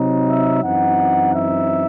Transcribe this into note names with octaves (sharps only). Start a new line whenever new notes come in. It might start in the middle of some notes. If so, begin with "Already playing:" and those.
Already playing: C3 F#3 C4 D#4
E5
F#2 E3 C4 D#4 F#5
E5